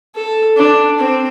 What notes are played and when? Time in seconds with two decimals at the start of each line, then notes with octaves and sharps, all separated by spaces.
0.15 A4
0.57 D4
0.99 C4